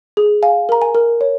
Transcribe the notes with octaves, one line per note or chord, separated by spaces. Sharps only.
G#4
F5 G#5
A#4 A#5
G#5
A#4
C#5